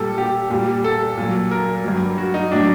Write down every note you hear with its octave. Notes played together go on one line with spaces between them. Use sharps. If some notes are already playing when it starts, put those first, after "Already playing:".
Already playing: A#2 G3 A4
G4
A#2 G3
A4
A#2 F#3
A#4
G2 F#3
F#4
D#4
A2 F#3 D4